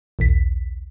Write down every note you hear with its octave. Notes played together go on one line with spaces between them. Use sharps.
A#1 D#2 B6